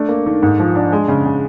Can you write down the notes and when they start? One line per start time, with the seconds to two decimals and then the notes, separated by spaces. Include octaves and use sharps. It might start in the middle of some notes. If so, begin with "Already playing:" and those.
Already playing: A3 D4
0.09 A#3
0.26 D#3
0.42 G#2
0.59 F3
0.75 D4
0.92 G#3
1.08 C#3
1.25 C#3